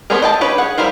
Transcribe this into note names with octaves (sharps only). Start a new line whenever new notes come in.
A3 B3 C4 G#4 A#4
D#5 G5 A5
C#4 G4 B4 C#5
G#4 F#5
G3 E4 F4 A#4 C5